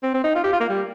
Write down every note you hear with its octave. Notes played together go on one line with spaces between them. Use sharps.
C4
C4
D#4
F4
G4
F4
A#3
G3